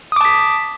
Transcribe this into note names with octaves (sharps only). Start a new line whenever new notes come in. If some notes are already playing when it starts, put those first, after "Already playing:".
A5 D6 D#6 B6